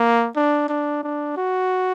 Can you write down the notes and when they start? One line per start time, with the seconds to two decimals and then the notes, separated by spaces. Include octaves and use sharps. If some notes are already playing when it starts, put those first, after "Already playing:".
Already playing: A#3
0.36 D4
0.69 D4
1.03 D4
1.37 F#4